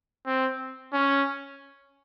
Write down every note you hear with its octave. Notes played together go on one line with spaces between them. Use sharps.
C4
C#4